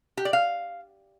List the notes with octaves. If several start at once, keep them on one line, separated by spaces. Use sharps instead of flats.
G4
D5
F5